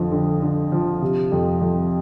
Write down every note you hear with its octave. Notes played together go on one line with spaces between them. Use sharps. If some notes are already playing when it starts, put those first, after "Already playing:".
Already playing: F2 D3 F3
D3
D3
F3
C3
F2
F2